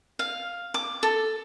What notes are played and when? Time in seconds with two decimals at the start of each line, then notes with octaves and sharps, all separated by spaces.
0.19 F5
0.74 D6
1.03 A4